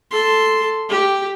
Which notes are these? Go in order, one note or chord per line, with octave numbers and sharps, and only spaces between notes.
A4 C6
G4